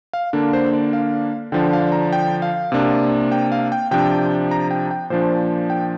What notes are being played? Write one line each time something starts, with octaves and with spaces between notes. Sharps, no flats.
F5
D3 A#3 D4
C5
D5
F5
D3 F3 D4 G5
F5
A#5
G5
F5
C3 A#3 D4
G5
F5
G5
C3 F3 D4 G5
A#5
G5
G5
A#2 F3 D4 C5
G5